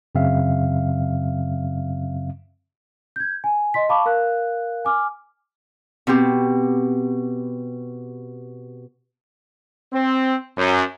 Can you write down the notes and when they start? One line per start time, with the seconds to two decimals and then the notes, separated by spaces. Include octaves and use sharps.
0.15 F#2 C#3 F#3 C4 E5 F5
3.16 G6 G#6
3.44 G#5
3.74 D#5 C6 B6
3.89 F5 A5 B5 C#6 D6
4.06 A#4 F5 F#6
4.85 G#5 D6 F6
6.07 B2 C4 G4
9.92 C4
10.56 F#2